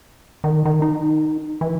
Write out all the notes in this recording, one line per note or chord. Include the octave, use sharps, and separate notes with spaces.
D#3
D#3
D#4
E3